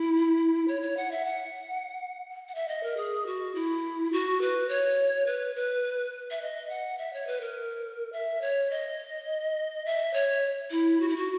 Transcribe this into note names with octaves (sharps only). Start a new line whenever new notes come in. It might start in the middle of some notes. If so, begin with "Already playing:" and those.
Already playing: E4
C#5
C#5
F#5
E5
F#5
F#5
E5
D#5
A#4
G#4
F#4
E4
F#4
B4
C#5
B4
B4
E5
D#5
F#5
E5
C#5
B4
A#4
E5
C#5
D#5
E5
C#5
E4
F#4
E4
F#4